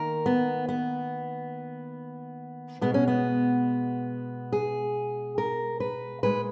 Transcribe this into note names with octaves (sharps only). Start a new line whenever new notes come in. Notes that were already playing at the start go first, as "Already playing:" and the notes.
Already playing: D#3 A#3 A#4
B3
B3
B2 G#3 B3
C#4
B3
G#4
A#4
B4
A#2 G#3 B4